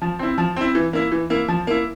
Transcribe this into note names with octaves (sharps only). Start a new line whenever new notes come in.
F3
C4 E4
F3
C4 E4
E3
A#3 E4
E3
A#3 E4
F3
A#3 E4